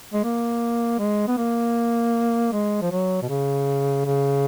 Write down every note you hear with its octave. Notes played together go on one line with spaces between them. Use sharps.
G#3
A#3
G#3
B3
A#3
G#3
F3
F#3
B2
C#3
C#3